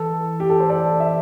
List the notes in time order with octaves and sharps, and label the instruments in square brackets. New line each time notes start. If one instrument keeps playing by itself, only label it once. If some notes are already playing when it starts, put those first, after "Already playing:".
Already playing: [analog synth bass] E3 [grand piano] A4
[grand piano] G4
A4
C5
A4 D5
E5